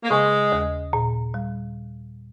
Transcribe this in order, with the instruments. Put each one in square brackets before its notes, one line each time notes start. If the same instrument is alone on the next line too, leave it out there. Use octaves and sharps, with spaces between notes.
[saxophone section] A#3
[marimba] C#3 [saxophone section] G#3
[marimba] D#2
A#2
G3